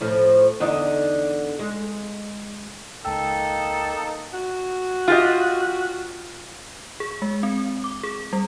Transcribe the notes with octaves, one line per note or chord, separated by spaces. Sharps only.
A2 F3
E2 D3 D#4
G#3
C#2 A#3 D#4 A4 G5 E6
F#4
F4 G4 D#5
G#4
G#3
C4
D6
G#4
G3